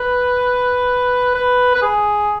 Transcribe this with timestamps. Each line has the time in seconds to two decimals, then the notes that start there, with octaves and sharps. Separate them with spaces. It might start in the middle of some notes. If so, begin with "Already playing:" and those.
Already playing: B4
1.35 B4
1.75 B4
1.82 G#4